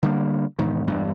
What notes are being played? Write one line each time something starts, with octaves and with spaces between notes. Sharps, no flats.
D3 G3 A#3
E1 G#2 D#3
E1 G2